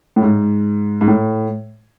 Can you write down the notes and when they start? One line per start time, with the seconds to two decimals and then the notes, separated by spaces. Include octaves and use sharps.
0.16 A2
0.22 G#2
1.01 G#2
1.08 A2